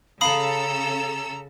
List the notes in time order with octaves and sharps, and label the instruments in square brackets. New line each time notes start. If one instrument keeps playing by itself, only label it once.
[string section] C#3 A4 E6 [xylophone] F5 B5 D#6 [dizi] A#5